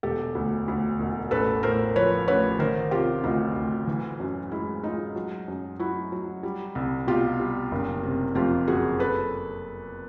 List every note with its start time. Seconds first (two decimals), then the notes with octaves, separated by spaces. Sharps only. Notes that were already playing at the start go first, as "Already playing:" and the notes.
0.03 E1 G4 A4
0.35 D2
0.68 D2
1.00 E1
1.31 A1 A4 B4
1.63 A2 A#4 C5
1.96 F3 B4 C#5
2.27 A1 B4 C#5
2.59 D#3 A#4 C5
2.91 C3 F4 G4
3.23 D2 D#4 F4
3.56 D2
3.87 E3
4.20 F#2
4.51 G#3 E4
4.83 G#3 D#4 F4
5.16 F#3
5.48 F#2
5.79 F#3 E4 F#4
6.12 F#3
6.43 G3
6.75 C2
7.07 B2 F4 G4
7.40 G3
7.72 F#1
8.03 C3
8.35 F2 F4 G4
8.67 F#1 F#4 G#4
8.99 A4 B4